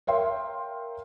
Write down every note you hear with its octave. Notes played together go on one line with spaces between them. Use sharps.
A#4 C#5 E5 F5 G5 C6